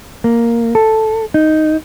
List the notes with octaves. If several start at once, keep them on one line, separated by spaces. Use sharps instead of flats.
A#3
A4
D#4